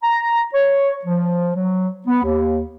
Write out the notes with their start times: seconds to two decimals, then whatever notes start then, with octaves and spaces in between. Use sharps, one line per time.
0.03 A#5
0.53 C#5
1.05 F3
1.55 F#3
2.07 B3
2.23 D#2